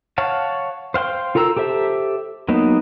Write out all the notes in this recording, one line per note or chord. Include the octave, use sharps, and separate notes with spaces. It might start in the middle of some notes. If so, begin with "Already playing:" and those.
C#5 F5 F#5 A5
C5 F5 G5 C6
F4 A4 A#4 A#5 E6
G4 A4 C5 E5
F#3 A#3 B3 D#4